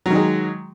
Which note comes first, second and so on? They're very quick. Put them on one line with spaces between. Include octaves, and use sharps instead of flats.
F#3 D#3 G#3